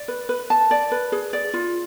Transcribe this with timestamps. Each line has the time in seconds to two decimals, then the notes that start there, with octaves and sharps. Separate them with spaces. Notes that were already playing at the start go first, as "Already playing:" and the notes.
Already playing: D5
0.08 B4
0.29 B4
0.50 A5
0.71 D5
0.92 B4
1.12 G#4
1.33 D5
1.54 F4